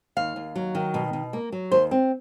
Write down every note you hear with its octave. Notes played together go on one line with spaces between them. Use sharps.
D#2 F5
D#2
F#3
D#3
B2
B2
A#3
F#3
D#2 C5
C4